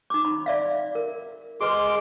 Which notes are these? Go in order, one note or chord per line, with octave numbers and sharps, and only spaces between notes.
D#4 D6
B5
D5 E5 F5
A#4
G#3 G#4 B4 C6 D6